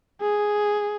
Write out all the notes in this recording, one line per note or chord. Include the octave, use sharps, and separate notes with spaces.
G#4